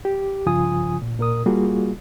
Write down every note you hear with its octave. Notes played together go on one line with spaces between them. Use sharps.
G4
G2 C#3 F3 F4 G#5 D#6
A#2
A#2 A#4 D#6
G3 A#3 F4 F#4 G#4